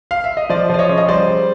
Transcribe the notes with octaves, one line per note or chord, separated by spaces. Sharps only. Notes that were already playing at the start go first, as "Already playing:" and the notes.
F5
E5
D#5
F3 C5 D5
F3 D5
C#5 D#5
C#3
D#5
G3 C5 D5
G3